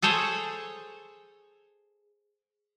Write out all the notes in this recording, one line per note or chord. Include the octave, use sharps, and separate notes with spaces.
G#4 A4 C5 C#5